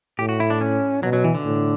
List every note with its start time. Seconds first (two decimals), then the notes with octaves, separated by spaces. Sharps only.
0.19 A2 G4
0.29 F#4
0.40 E4
0.50 D4
0.61 C#4
1.03 B2 F#3
1.13 F#3
1.24 E3
1.35 D3
1.45 A2